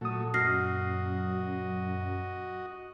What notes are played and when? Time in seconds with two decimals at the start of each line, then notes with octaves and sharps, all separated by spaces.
0.01 A#2 F#3 A3 D#6
0.34 F#2 F#4 D#5 F6 A#6 C7